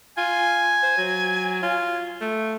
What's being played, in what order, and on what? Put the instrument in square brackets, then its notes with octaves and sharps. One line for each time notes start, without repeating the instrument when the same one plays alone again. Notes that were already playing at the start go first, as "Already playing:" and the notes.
[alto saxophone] F4 [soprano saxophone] G#5
[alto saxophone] C5
F#3
F4
A3